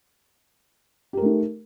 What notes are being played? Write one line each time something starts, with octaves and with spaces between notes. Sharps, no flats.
A3 D#4 G4 A#4